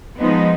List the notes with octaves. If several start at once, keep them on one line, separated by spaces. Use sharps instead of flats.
F3 G#3 B3 D#4